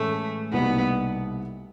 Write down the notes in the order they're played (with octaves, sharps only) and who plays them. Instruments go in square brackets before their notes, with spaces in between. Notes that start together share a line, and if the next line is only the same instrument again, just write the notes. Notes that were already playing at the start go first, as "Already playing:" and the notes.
Already playing: [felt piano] A2 E3 G#3 C#4 [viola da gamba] A3
[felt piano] C2 B2 G3 A#3 D#4 [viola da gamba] B3